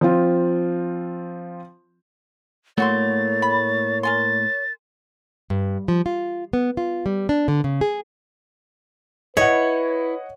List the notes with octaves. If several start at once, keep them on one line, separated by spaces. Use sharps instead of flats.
F3 C4 F4
A2 F#3 A3 A#3 F#4 C#5 C6 A6
B5
A#4 G#5 C6 A6
G2
F3
F4
B3
F4
G3
D4
D3
C#3
G#4
E4 B4 C#5 D#5 F#5